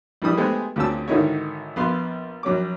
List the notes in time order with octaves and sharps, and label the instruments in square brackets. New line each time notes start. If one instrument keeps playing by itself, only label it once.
[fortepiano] A#1 E3 G3 D#6
G#3 A3 B3 G4 G#4 C5
D2 A#2 C#3 C4 A5 E6
G#1 D3 D#3 D#4 E4 C#5
A#1 B3 F5 C6
A#1 F#3 C#4 D6